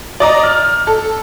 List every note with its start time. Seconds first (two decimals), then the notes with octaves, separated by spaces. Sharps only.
0.20 D5 D#5 A#5
0.43 F6
0.87 A4